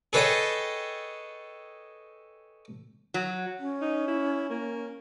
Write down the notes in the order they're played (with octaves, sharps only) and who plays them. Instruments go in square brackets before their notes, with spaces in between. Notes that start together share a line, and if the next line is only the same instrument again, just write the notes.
[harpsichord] G#4 A4 B4 C#5 D#5 G5
[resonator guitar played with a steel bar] F#3
[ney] C#4
[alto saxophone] D#4
E4
A#3